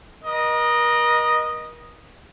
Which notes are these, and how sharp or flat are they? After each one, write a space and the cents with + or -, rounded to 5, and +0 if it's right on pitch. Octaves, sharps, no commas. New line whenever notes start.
A#4 +40 D#5 -5